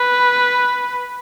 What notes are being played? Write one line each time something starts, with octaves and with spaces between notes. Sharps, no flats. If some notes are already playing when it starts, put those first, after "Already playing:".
Already playing: B4